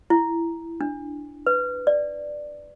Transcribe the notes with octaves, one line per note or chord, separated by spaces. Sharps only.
E4
D4
B4
D5